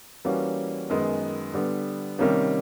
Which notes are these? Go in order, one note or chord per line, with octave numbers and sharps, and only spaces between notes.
E3 G3 A#3 C#4 F#4
F#2 D#3 G#3 B3
D3 G3 B3
C3 D#3 G3 A#3 C#4